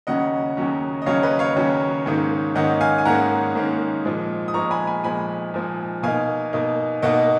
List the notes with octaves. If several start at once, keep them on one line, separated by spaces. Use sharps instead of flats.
D#2 C#3 F#3 C#4 D#5 F#5
D#2 C#3 F#3 C#4
D#5
D#2 C#3 F#3 C#4 C#5 F5
B4 D#5
C#5 F5
D#2 C#3 F#3 C#4
G#2 D#3 A#3 C#4
G#2 D#3 A#3 C#4 D#5 F#5
F5 G#5
G#5
G#2 D#3 A#3 C#4 F#5 A#5
G#2 D#3 A#3 C#4
A#2 F3 G#3
D#6
A#2 F3 G#3 A#5 C#6
G#5 B5
G#5 B5
A#2 F3 G#3 G#5 B5
A#2 F3 G#3
B2 A#3 D#4 F5 G#5
B2 A#3 D#4
B2 A#3 D#4 D#5 F#5